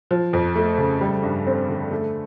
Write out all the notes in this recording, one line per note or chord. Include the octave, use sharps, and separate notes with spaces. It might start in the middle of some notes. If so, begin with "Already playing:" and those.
F3
F2
A3
C#3
G3
G2
C4
D3
A3